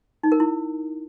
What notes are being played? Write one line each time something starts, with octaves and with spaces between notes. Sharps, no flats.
D#4
A#4
E4